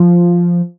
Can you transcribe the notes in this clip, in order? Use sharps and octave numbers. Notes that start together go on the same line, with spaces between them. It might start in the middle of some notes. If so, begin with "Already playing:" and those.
Already playing: F3